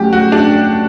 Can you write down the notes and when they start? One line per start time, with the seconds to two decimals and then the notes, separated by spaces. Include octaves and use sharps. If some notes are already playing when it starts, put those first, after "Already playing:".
Already playing: F#3 A3 C#4 E4 G4
0.13 F#4
0.32 D4